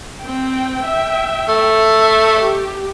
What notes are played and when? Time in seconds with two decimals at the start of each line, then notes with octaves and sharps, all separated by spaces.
0.22 C4 G5
0.84 E5 G5
1.48 A3
2.02 E5
2.41 G4